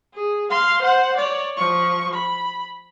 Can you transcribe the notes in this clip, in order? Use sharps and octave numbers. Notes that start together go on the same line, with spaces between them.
G#4
F5 C6
C5 F#5
C#5 D5
F3 C#6
B5